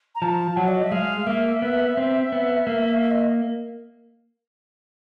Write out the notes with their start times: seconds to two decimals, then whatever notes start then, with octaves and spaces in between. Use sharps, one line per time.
0.15 A#5
0.22 F3 A5
0.56 F#3 F#5
0.68 D5
0.75 D#5
0.83 E5
0.91 G#3 F5
1.27 A#3 E5
1.62 B3
1.97 C4
2.32 B3
2.67 A#3
3.02 E5
3.11 D#5